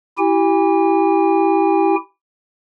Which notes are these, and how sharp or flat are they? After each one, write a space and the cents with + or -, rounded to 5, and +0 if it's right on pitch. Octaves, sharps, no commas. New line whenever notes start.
E4 +0 G4 -20 G#5 -40